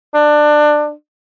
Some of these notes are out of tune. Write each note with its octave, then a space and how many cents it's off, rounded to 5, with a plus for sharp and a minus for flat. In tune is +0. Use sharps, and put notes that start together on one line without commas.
D4 +20